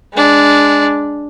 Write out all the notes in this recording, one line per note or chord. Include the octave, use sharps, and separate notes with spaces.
G#3 D4